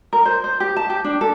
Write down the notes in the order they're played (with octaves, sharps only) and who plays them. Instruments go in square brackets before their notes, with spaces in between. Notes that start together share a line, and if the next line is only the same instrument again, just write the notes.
[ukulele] A#4
C5
C5
G4
A5
G4
D4
A4